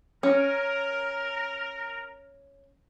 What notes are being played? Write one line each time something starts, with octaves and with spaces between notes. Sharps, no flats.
C#4 A#4